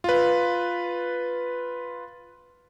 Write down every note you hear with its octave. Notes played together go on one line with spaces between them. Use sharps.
F4 B4